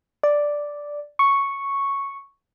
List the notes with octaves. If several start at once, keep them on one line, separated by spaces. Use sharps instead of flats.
D5
C#6